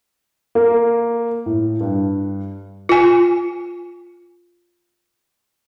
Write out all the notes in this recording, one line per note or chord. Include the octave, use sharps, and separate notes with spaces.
A#3
A2
G2
F4 G#5